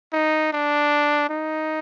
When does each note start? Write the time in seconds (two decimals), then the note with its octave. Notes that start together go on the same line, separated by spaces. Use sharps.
0.13 D#4
0.53 D4
1.29 D#4